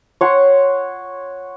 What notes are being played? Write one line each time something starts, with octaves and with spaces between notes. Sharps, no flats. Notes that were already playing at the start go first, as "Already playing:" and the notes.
C#5 F#5 C6